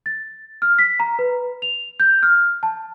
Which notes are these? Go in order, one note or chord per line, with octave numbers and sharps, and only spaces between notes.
A6
F6
B6
A#5
B4
F7
G6
F6
A5